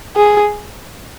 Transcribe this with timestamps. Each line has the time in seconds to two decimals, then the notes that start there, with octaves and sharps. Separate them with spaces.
0.16 G#4